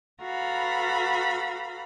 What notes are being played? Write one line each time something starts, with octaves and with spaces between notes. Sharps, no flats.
F#4 A4 B4 F5 A#5 B5